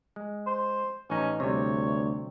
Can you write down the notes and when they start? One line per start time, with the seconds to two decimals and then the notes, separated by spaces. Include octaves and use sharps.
0.16 G#3
0.47 C5
1.10 A1 C#4 D#4
1.40 D2 C3 G3 C#5